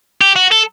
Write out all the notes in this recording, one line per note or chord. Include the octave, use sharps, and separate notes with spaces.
G4
F#4
A4